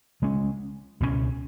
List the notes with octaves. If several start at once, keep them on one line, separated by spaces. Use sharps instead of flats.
C#3 G#3 C#4
C#2 B2 F#3 C#4